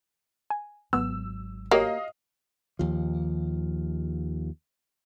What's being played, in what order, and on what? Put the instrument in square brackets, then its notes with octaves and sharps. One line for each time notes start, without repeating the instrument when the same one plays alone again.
[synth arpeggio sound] G#5
[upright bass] G#1 F#3 [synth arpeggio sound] B3 [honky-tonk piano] E6
[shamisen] A#3 [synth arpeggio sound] F#4 G4 C#5 [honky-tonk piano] D#5 F5
[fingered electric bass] D#2 F3